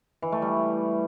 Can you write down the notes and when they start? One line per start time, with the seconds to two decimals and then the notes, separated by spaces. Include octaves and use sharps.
0.22 E3
0.32 A3
0.42 G3